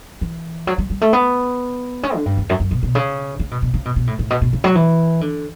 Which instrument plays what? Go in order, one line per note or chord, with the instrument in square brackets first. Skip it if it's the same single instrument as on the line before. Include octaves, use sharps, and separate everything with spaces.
[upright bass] E3
F#3
G3
G3
A3
B3
C#4
D3
G2
E2
F#2
F#2
B2
B2
C#3
C#3
B2
B2
C#3
B2
B2
A2
A2
B2
B2
C#3
F#3
E3
D3